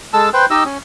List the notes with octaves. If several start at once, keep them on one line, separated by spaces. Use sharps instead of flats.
G#3 A4 A5 E6
B4 C5 G5
D#4 G4 D#5 E6
C#4